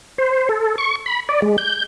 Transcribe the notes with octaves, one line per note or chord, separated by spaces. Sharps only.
C5
A4
C#6
B5
D5
G#3
G6